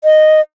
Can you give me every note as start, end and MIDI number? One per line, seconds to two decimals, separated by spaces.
0.04 0.40 75